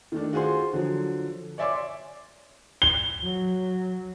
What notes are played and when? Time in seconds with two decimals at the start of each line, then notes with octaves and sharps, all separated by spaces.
0.12 D#3 A3 D4
0.33 F4 F#4 G#4 C5 C6
0.73 D3 F3 F#3
1.58 C#5 D5 E5 G#5 C6 D6
2.82 G7
3.23 F#3